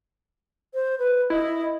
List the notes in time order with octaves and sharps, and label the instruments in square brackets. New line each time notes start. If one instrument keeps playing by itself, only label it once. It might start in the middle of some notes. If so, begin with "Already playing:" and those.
[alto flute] C5
B4
[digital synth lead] E4 [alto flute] D#5